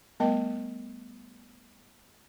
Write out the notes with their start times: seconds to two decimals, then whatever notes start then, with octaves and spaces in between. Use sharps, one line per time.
0.20 G3 A3 B3 A#4 D#5 G5